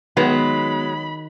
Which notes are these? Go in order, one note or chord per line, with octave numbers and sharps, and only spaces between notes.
D#3 F#3 G#3 B3 B5